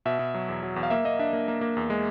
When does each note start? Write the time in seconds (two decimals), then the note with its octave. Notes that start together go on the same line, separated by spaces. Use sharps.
0.05 B2 E5
0.19 B2
0.34 F#3
0.49 E2
0.63 F#3
0.76 E2
0.83 F5
0.90 A#3 E5
1.05 A#3 D#5
1.19 D4 E5
1.33 A#3
1.48 A#3
1.61 A#3
1.77 E2
1.90 G#3